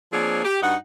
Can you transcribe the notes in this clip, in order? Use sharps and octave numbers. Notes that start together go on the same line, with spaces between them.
F3 A#3 C4 D4 G#4 C#5
G4
G2 D#4 F#4 D#5 F#5